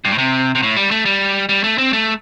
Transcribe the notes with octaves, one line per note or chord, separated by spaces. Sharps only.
G2
A2
C3
C3
A2
G3
A3
G3
G3
A3
C4
A3